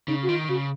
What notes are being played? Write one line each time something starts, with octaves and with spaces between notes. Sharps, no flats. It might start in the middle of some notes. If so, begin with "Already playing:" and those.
C#3 D#4
F#4
D#3 F4
C#3 F#4